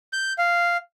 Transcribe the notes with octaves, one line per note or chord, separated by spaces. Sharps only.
G6
F5